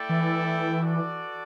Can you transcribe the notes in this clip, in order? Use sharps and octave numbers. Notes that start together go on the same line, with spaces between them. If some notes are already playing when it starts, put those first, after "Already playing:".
Already playing: A3 E4 A4 D5 G5
E3
F#4 A4 D5